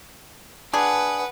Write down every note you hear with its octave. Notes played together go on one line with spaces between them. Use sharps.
D4 G#4 B4 F#5